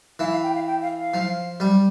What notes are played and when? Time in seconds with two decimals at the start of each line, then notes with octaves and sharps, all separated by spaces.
0.19 E3 F5
0.31 F5
0.43 G5
0.55 F5
0.67 G5
0.82 F5
0.98 F5
1.14 F3
1.60 G3